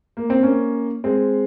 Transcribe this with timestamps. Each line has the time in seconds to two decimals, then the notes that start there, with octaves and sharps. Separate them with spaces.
0.17 A#3
0.30 C4
0.43 A#3 C#4
1.04 G#3 C4